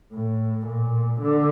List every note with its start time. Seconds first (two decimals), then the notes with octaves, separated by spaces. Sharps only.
0.13 A2
0.67 A#2
1.21 D3